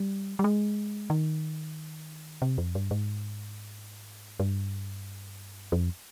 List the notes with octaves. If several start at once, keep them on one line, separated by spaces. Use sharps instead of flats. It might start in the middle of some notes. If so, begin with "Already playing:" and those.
Already playing: G3
G3
G#3
D#3
C3
F2
G2
G#2
G2
F2